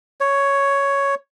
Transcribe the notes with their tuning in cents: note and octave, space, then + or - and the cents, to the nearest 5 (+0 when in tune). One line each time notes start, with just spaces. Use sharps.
C#5 +5